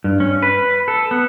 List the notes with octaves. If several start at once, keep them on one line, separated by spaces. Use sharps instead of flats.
G2
C#4
B4
A4
B3